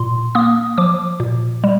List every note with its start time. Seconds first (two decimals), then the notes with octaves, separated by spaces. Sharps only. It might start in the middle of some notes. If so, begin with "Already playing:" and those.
Already playing: A#2 C6
0.35 A#3 D#6
0.78 F3 D6
1.20 A#2
1.64 G3